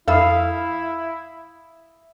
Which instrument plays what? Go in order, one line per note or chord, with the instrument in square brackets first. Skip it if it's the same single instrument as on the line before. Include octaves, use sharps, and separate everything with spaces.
[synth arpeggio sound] F2 A4 E6 [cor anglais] E4 [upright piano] E5 B5 D#6 [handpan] F5